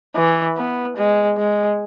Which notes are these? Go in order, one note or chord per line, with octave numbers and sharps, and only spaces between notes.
E3
B3
G#3
G#3